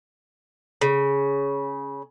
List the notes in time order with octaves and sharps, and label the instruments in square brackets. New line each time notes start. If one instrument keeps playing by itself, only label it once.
[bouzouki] C#3